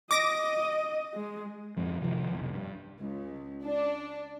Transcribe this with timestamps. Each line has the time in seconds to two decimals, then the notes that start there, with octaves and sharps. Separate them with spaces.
0.11 D#5 D6 A#6
1.14 G#3
1.77 F2 G#2 F3
2.01 C3 D#3 F3
2.32 F1 B1
2.53 G2
3.00 C#2
3.63 D4